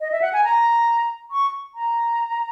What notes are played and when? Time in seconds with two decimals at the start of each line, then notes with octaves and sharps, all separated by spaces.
0.01 D#5
0.12 E5
0.22 F#5
0.33 G#5
0.44 A#5
1.31 C#6
1.75 A#5